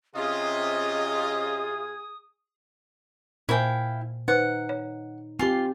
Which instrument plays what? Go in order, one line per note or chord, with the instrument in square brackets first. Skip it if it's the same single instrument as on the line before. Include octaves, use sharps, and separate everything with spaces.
[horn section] C3 F4 [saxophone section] C#4 D#5 [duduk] G#4 [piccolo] D#6
[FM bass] A#2 [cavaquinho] E4 F5 G5 [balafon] A#4 C5 G#5
[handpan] D#4 [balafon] B4 C5 [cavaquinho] F#5
[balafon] C#5
[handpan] C4 G4 [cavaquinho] F4 C6 [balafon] G#5